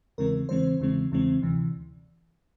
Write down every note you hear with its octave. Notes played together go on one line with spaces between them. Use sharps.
E2 C#3 E3 G#3 C4 A#4
E2 C#3 E3 G#3 C4 C5
E2 C#3 E3 G#3 C4
E2 C#3 E3 G#3 C4
D2 C3 E3